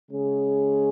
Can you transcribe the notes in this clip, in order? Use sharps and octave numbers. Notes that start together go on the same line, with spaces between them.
C#3 G#3 C#4 G#4